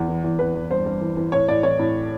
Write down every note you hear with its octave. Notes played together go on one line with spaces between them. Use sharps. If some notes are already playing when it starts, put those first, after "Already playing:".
Already playing: E2
E3
E2
E2 B4
E2
G2 C5
G2
E3
E3
A2 C#5
A2 D5
E3 C#5
A2